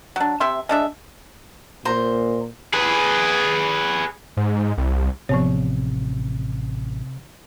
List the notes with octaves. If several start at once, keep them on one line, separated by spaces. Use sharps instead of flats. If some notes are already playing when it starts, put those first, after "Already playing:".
F#3 D4
C3 E5 C6
G#3 D4 E5
A#2 C5 A#5
G#4 B4
G#2
C2
A1 C3 F3 B3 C#5